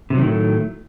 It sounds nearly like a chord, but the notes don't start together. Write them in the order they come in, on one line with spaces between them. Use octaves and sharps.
C3 F#3 D#3 A2 A3